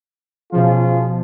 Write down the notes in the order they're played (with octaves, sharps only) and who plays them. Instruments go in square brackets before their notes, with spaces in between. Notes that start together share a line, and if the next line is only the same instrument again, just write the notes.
[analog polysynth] B2 F3 [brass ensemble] C#4 F4 G#4